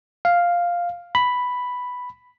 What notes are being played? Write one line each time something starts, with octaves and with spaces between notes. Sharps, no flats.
F5
B5